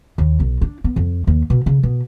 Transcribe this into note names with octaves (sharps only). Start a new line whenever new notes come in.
D#2
B1
D4
B3
F2
D#2
B2
C#3
B2